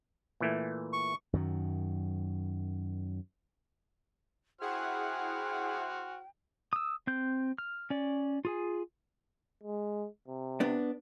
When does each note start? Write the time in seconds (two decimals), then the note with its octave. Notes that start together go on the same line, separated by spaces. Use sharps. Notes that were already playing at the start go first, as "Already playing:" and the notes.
0.40 A#2 E3 A3
0.93 C#6
1.33 F#2 D#3 F#3
4.61 E4 F#4 G#4 C5 F#5 G5 F6
6.73 D#6 E6
7.07 C4 G6
7.58 F6
7.90 C#4 D5
8.45 F4 G#4 G#5
9.63 G#3
10.28 C3
10.60 B3 D4